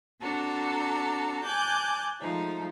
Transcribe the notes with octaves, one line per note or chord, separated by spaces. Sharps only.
C4 D4 F#4 A4 A#5
G#5 A5 D6 F#6 G6
F3 G#3 A3 D#4